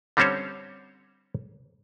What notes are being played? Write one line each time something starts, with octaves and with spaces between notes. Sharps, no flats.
D3 G3 C4 C#4 C5 C#5